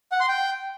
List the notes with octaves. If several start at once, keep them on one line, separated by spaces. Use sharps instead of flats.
F#5
C6
G5